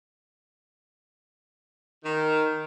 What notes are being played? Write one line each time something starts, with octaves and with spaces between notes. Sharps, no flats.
D#3